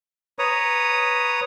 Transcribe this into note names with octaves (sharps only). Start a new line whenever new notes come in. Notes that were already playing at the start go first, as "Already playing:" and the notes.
B4 C#5 A#5 D#6